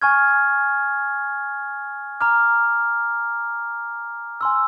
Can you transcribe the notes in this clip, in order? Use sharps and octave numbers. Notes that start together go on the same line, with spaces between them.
G#5 C#6 F6 G#6
A#5 D6 F6
G#5 C6 E6